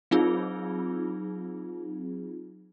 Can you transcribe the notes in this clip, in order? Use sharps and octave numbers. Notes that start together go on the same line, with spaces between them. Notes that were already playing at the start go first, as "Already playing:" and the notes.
F#3 C4 D#4 F4 G#4